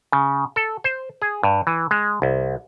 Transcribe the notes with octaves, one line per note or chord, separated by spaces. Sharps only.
C#3
A4
C5
G#4
G2
E3
G#3
C2